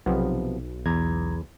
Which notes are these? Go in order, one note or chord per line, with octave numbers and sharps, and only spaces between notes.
B1 C3 F3 B3
E2 A#5 G#6